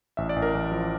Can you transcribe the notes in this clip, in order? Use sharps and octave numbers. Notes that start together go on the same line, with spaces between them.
A1 E5
D5
A1
A#4
A1
F3